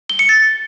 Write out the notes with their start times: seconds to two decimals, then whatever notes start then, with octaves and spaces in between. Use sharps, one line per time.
0.09 G7
0.19 C#7
0.29 A6